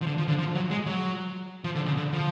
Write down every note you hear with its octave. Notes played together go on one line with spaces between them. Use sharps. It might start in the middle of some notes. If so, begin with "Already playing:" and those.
F3
D3
F3
D3
F3
F#3
G#3
F#3
F3
D3
C#3
D3
F3